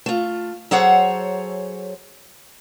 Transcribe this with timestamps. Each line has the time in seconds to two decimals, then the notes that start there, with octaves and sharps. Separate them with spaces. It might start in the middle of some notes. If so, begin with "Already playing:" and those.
0.06 A3 F4
0.71 F#3 G#4 A4 C5 C#5 F#5